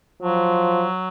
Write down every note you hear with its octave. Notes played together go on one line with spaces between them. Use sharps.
F3 F#3